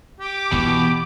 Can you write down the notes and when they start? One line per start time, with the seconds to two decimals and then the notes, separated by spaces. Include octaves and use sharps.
0.20 G4 D6
0.52 B2 E3